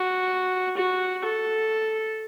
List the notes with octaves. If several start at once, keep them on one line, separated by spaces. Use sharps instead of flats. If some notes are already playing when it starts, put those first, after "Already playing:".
Already playing: F#4
F#4
A4